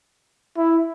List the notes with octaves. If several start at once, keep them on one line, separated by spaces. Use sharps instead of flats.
E4